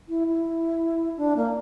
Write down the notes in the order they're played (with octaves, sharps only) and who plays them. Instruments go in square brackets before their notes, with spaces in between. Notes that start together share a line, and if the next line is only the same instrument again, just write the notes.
[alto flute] E4
E4
D4
A#3